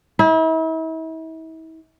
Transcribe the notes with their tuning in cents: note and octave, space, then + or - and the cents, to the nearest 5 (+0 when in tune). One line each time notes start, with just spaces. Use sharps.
E4 -40